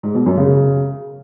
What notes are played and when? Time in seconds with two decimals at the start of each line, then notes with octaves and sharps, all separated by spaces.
0.03 G#2
0.15 B2
0.26 F#2
0.38 C#3